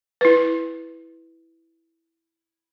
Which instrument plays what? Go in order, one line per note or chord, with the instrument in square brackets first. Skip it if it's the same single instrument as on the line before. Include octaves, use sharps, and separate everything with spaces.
[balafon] E4 B4